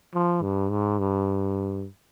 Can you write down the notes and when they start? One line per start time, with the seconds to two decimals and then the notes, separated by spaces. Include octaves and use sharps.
0.14 F3
0.43 G2
0.71 G#2
0.99 G2